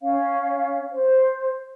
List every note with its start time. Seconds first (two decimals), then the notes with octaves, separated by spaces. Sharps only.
0.01 C#4 C#5 F5
0.91 C5